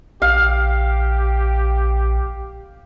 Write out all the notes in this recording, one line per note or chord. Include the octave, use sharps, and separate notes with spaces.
A#1 G4 F5